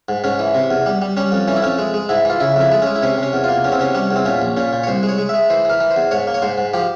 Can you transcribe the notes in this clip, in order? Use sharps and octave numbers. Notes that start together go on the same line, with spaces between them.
G#2
G#2 C#4
E3
C3
E2
G3
G3
G3 C#4
F2
E3 C#4
E4
F2 C#4
G#3
G#3
G#2 E4
E3 F4
C#3 E4
F2 E4
G#3
G#3 C#4
E4
C3 C#4
C3 C#4
E2
F4
A#3
E2 C#4
C4
C3 C#4
G3 C#4
E2
C4
A#2 C#4
A#1
A#2 C#4
A#2
C#5
C2 C5
G#3
C#5
G#3
G#3 E5
E3 C5
E3 A#4
E3
C5
E2
G#2 C#5
A#3
C#5
G#2 C5
G#2
F3 G4